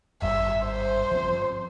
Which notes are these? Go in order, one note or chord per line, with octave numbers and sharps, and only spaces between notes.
G#1 G2 E5
C5
F3 C4